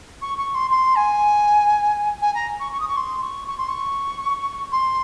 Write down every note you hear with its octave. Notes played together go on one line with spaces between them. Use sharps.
C#6
C#6
C6
C6
G#5
G#5
A#5
C#6
C#6
D#6
C#6
C6
C#6
C#6
C6
C#6
C6